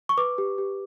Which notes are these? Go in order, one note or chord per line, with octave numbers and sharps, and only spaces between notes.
C#6
B4 D6
G4
G4